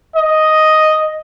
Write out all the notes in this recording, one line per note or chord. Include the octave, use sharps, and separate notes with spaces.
D#5